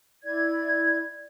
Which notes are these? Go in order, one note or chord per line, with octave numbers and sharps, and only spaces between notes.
E4 D5 G#6